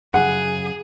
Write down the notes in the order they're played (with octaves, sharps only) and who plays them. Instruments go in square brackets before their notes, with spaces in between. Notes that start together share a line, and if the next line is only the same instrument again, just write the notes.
[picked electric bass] F#2 C#3 [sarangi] G#4 [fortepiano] F#5